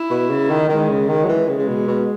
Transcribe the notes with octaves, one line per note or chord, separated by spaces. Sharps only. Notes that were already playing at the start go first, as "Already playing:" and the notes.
Already playing: E4
B2
C#3
D#3
D#3 G#3
C#3
D#3 G#3
F#3
E3
C#3 G#3
C#3
B2
B2